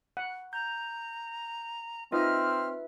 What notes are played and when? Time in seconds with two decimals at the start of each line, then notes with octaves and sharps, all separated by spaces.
0.17 F#5
0.53 A#5 G6
2.12 C4 D#4 F4 B4 D#5 E5 F6